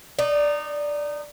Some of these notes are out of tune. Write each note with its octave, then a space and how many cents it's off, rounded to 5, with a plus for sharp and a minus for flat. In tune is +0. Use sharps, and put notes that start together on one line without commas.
D#4 -20 D5 +0